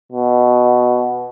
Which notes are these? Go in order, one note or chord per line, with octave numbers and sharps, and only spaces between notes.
B2